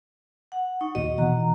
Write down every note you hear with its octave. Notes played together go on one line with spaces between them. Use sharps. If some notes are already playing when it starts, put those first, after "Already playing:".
F#5
D#4 C#6
D#2 A#2 F#4 D#5
B2 E3 F#5 A#5